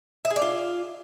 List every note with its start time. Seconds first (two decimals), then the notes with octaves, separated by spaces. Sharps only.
0.25 E5
0.30 G#4
0.36 D5
0.42 F4